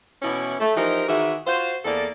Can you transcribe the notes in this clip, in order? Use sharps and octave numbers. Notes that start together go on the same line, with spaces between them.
B2 E3 C#4 E4
A3
E3 F3 D#4 G4 A#4
D#3 E3 F#4 G#4 E5
F4 F#4 C5
E2 A#3 A4 D5